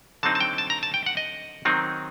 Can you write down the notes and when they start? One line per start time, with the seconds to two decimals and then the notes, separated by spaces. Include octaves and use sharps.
0.23 D3 F#3 C4 D#4 A5
0.35 A5
0.40 G5
0.58 A5
0.70 A#5
0.83 A5
0.94 G5
1.06 F#5
1.17 D#5
1.65 D#3 F#3 C4 D#4